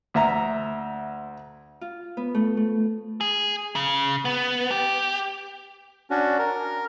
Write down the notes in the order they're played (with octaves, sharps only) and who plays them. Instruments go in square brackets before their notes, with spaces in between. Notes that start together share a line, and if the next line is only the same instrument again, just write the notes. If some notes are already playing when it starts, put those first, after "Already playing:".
[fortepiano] D2 E5 A#5
[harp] F4
B3
A3
A3
[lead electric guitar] G#4
C#3
B3
G4
[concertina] C#4 D4 F#4
A#4